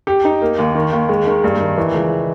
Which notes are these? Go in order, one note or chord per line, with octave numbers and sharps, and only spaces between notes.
G4
D#4
A#3
D#2
D#3
D#2
G#3
D#3
G2
D#3
E3
C#2